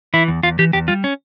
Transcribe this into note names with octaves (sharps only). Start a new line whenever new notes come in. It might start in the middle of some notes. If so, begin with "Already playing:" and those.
E3 E4
E2
E2 F4
E3 G4
E2 G4
G3 F4
C#4